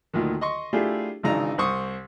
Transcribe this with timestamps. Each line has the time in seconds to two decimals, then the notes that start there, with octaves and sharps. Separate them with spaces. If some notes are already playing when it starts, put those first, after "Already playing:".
0.13 D2 A#2 D#3
0.41 D#5 C6 C#6
0.73 A3 D4 E4 F4 G4 G#4
1.23 G#1 C#3 E3 D4 D#4 A#5
1.58 C2 C5 C6 C#6 D#6